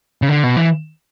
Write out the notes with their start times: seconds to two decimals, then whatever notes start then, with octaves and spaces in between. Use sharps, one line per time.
0.22 C#3
0.29 D3
0.43 B2
0.56 E3